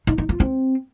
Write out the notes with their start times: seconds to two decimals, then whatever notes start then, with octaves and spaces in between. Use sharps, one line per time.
0.07 D#4
0.18 D#4
0.29 F4
0.40 C4